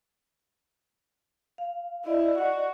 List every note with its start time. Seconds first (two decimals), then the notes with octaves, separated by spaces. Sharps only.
1.58 F5
2.05 E4 D5 D#5
2.38 F#4